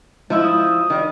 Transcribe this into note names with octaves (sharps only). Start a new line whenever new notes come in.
F3 G#3 E4
D#6
D#3 G3